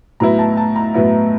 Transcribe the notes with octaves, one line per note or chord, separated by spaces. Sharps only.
A2 F#3 B3 E4 A#5
A5
A5
A#5
A2 F#3 B3 E4